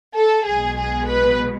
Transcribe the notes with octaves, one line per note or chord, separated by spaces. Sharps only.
A4
B1 B2 G#3 G#4
G#4
B4